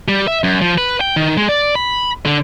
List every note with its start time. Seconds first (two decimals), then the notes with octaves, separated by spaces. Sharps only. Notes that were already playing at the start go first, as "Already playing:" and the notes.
0.08 G3
0.28 E5
0.44 F#2
0.61 F3
0.78 B4
1.01 G5
1.16 D#3
1.37 G#3
1.49 D5
1.75 B5
2.26 D3